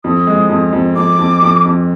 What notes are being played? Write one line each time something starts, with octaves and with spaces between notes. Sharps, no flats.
F2 D#6
G#3
F2
F2
F2 D6
F2
F2
F2